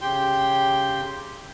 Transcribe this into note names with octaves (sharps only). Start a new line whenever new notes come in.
C#3 G4 G5 C6